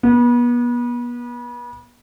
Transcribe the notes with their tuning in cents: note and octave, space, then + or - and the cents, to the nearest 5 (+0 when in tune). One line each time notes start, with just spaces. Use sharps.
B3 -35